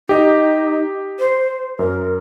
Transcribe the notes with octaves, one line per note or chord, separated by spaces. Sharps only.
D#4 G4 D#5
C5
F#2 A#4